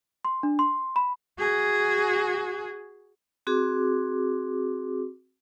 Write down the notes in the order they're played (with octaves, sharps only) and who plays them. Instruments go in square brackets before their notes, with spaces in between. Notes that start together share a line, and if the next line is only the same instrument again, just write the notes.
[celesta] C6
D4
C6
B5
[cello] F#4 G#4
[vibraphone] C4 F#4 G#4 D6